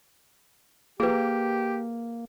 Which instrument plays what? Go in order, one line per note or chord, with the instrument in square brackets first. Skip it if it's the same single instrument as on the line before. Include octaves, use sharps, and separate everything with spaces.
[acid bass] A#3 [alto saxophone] G4 [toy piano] G#4 B4